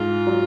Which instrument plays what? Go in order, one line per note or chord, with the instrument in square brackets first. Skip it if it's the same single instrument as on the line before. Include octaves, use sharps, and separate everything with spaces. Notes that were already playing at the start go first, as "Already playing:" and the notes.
Already playing: [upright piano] G#2 [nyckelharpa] F4
[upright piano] F#3